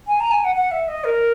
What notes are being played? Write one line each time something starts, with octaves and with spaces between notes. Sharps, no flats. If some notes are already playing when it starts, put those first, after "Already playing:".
G#5
A#5
G#5
F#5
F#5
E5
D#5
A#4